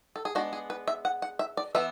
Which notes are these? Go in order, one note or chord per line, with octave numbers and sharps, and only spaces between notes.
A4
G#4
G#3 B3 D4 F#4
G#4
B4
E5
F#5
F#5
E5
D5
E3 B3 E5